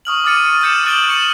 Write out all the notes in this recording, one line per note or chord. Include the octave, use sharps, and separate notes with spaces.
C#6 D#6 F6 F#7
D6 D#6 F6 A6 C#7 D#7
E6 F6 G6 A6 C#7 E7
D6 F#6 A6 D7 F#7 G7
C#6 C#7 E7 F#7